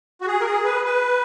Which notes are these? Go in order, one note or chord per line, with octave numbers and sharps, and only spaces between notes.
F#4
G#4
A#4
G#4
B4
B4